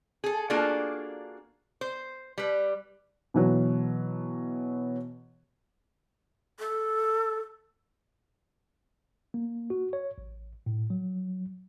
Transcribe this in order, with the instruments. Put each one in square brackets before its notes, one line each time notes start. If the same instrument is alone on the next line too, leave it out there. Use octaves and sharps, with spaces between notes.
[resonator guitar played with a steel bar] G#4 A4
A#3 D4 F4 F#4 G#4 A4
C5
G3 B4
[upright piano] B2 E3 F#3
[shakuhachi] A4
[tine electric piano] A#3
F#4
C#5
A1
A2
F#3